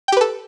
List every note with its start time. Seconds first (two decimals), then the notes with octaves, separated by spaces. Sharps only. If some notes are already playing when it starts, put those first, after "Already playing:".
0.08 G5
0.12 G4
0.17 B4
0.21 A4